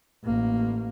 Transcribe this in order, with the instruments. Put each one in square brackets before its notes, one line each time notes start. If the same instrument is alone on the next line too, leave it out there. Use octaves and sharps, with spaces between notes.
[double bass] A1 A#3